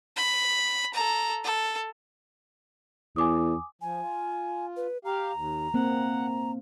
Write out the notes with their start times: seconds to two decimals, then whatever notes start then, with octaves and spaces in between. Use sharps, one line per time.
0.17 B5
0.94 A4 A#5
1.45 A4
3.16 E2 G#5 D6 D#6
3.82 F3 G#5
4.01 F4
4.77 B4
5.05 G4 F5 A#5
5.34 D#2
5.74 A#3 C4 F#5